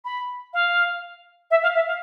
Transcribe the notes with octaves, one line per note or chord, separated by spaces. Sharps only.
B5
F5
E5
F5
E5
F5